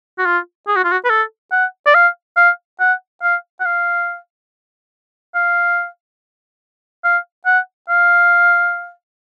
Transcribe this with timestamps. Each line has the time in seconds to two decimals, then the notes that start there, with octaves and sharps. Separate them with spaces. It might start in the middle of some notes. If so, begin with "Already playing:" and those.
0.19 F#4
0.25 F4
0.68 G#4
0.76 F#4
0.84 F4
0.92 F#4
1.05 B4
1.10 A4
1.52 F#5
1.86 D5
1.94 F5
2.37 F5
2.80 F#5
3.22 F5
3.60 F#5
3.65 F5
5.35 F5
7.04 F5
7.46 F#5
7.89 F5